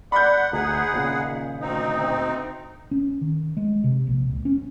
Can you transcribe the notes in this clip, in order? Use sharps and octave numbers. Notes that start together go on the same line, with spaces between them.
D5 F#5 B5 G6
D2 D#4 G#4 F#5
D#1 A#2 C#3
D2 C4 D#4 D#5
C#4
D#3
G#3
C3
A#1
C#2
C#4